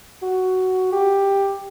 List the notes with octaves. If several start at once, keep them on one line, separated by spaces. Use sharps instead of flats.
F#4
G4